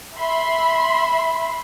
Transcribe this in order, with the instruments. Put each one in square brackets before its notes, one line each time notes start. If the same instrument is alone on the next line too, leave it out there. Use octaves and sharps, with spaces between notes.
[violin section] E5 B5 C6